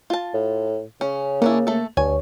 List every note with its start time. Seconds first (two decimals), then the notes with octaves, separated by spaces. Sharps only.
0.10 F4 A5
0.34 A2
1.01 C#3 C#4
1.42 A#3 C#4 D4 E4
1.67 A3 A4
1.97 D2 G2 C#5 G#5